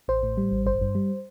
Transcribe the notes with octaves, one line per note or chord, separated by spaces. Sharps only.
A1 C5
A2
G3
A1
G1 C5
G2
G3